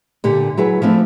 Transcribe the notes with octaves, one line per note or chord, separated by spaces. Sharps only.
A#2 D3 G4
F#3 E4 G#4 B4
F3 A3 C4 D4